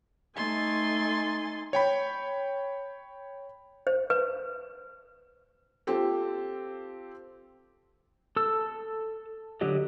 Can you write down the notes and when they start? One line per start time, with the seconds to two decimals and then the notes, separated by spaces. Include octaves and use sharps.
0.34 A3 D#4 G#5 C6 A6
1.73 C#5 G5 B5
3.87 C5
4.10 B4
5.87 C4 F4 G4 A4
8.36 A4 E6
9.61 D3 F#3 G4 D#5